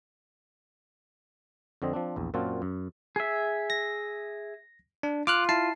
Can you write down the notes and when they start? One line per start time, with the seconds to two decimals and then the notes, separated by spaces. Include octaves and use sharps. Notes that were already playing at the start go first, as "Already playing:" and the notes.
1.82 F2 D3 C4 D#5
1.93 F3 C4 D4
2.16 A#1 E2
2.34 F#2 A#2 C4 F4 F#4 A5
2.62 F#2
3.16 G#4 E5
3.70 A#6
5.03 D4
5.27 F4 D6 F6 F#6
5.49 E4 A5 C7